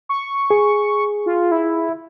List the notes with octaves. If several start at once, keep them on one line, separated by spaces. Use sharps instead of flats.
C#6
G#4
F4
E4